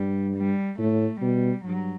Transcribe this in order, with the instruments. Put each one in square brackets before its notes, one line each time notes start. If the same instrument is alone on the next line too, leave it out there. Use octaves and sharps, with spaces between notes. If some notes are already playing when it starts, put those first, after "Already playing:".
Already playing: [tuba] G2 [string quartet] G3
[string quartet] G3
[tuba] A2 [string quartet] A3
[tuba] B2 [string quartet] G3
[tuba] G2 [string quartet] F#3